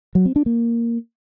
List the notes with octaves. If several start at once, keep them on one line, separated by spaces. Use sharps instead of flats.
F#3
C4
D4
A#3